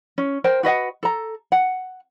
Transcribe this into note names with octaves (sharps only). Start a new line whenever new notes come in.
C#4
A#4 C5 G5
F#4 B4 D#5 F#5
A4 A#5
F#5